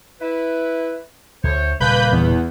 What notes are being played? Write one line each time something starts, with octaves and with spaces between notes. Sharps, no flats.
E4 B4
D2 D3 A3 C5 C#5
D#1 C#3 G3 A#3 B4 B5 G6
E2 B3